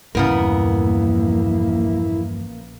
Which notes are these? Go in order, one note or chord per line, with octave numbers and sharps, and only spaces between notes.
A#1 E2 G2 C#3 A#3 B3 E4 A#4